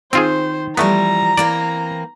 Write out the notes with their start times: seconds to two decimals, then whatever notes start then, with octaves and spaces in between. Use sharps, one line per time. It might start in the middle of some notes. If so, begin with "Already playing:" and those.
0.13 D#3 C4 F4 G#4 C5
0.77 E3 F3 G3 A3 B3 A#5
1.37 E3 A#3 C4 D5